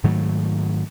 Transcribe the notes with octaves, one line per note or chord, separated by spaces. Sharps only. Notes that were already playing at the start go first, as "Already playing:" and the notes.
G#2 D#3 F#3 A3